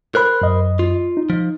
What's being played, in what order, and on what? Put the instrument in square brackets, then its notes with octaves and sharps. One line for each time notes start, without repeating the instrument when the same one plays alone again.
[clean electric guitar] A#4 C5 B5 [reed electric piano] F#6
[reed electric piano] F#2 D#5
[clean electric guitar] F4
[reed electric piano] D#4
[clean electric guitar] F3